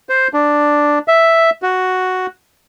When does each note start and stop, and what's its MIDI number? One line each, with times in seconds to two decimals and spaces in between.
0.09 0.28 72
0.34 0.99 62
1.08 1.50 76
1.62 2.26 66